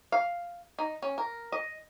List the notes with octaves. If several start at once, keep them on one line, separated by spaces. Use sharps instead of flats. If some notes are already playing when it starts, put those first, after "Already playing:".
F5
D#4
C#4
A#4
D#5